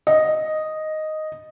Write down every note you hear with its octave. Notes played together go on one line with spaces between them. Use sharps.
D#5